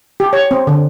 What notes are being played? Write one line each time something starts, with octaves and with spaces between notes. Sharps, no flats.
G4
C#5
C4
D3